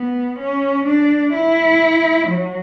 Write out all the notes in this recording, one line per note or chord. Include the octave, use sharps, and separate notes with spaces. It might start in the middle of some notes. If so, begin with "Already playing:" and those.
Already playing: B3
C#4
D4
E4
F#3